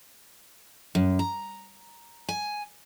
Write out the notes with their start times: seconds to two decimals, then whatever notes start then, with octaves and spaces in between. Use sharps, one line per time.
0.95 F#2
1.19 A#5
2.29 G#5